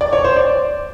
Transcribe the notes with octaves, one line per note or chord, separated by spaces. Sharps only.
D5
C#5
C5
D5